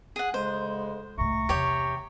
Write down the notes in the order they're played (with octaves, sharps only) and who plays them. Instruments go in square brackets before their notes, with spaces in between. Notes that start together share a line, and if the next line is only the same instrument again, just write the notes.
[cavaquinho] G#4 F#5
[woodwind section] D2 C#3 G#3 [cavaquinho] C5
[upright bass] C2 A2 [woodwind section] E5 A#5 C#6
[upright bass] E2 C3 [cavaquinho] G4 C#5 G5